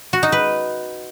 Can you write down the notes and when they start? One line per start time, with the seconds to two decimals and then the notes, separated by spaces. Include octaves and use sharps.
0.13 F#4
0.23 D#4
0.32 B4